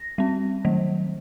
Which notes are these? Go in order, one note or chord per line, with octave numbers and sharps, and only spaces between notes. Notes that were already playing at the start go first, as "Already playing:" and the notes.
Already playing: A#6
G3 C4
D#3 F#3 A3